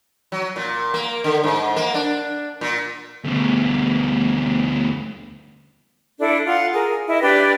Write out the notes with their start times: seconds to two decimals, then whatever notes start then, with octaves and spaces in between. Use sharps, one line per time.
0.32 F#3
0.56 A#2
0.94 A#3
1.24 D3
1.44 G#2
1.76 A#3
1.94 D4
2.61 A#2
3.24 D2 B2
6.19 D4 E4 A4
6.46 F4 F#5
6.73 G#4 A#4
7.08 E4 D#5
7.21 D4 G4 B4 D5